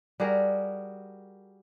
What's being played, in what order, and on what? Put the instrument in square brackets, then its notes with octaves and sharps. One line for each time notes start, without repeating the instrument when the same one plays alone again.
[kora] G3 F#4 G#4 A#4